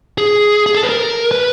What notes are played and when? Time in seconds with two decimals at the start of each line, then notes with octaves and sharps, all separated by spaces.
0.18 G#4
0.66 G#4
0.74 A4
0.83 B4
0.89 A#4
1.31 B4